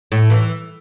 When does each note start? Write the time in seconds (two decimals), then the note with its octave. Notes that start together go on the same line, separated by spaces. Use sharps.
0.12 A2
0.30 E3